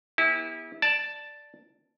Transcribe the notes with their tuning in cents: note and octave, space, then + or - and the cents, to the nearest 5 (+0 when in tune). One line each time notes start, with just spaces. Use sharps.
B3 -40 E4 -25 G4 +45
D5 +0 A5 +0